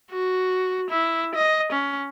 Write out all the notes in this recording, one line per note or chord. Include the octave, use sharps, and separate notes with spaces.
F#4
E4
D#5
C#4